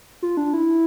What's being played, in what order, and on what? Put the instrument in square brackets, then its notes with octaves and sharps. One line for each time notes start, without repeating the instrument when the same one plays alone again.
[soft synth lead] F4
D4
E4